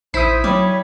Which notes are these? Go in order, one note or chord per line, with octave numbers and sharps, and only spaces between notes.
A1 E4 C5 D#6 B6
F#3 G3 C#5